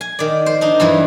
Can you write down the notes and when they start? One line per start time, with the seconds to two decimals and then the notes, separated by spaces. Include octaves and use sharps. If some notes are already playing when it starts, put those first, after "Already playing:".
0.01 G#5
0.19 D#3 D5
0.46 C5
0.61 D4 D#4
0.80 G2 E3 F#3 G3